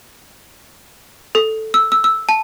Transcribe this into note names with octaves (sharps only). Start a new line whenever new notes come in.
A4
E6
E6
E6
A5